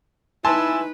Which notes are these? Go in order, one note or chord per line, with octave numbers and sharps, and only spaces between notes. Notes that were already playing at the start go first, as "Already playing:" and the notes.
D#4 E4 B4 G#5 A5 C6